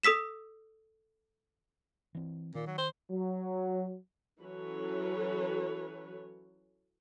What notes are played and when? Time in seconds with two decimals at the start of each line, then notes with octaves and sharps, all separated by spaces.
0.03 A4 D#6 E6 B6 E7
2.15 E3 C4
2.55 A#2 D#3
2.67 F#3
2.78 C5
3.10 F#3
4.40 E3 F#3 C#4 A4 B4 C#5